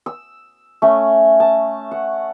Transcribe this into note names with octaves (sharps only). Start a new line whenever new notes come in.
E6
A3 C#4
A5
F#5